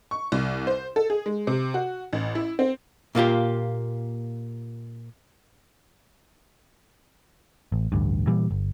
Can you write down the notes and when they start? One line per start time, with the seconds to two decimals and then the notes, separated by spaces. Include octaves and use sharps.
0.11 C#6
0.32 C2
0.67 C5
0.96 A4
1.10 G#4
1.26 G#3
1.47 C3
1.74 F#4
2.13 A1
2.35 E4
2.59 C4
3.15 A#2 A#3 F4 G4
7.72 A1
7.92 A1 D2 G2
8.27 A#2 E3 G3
8.51 G1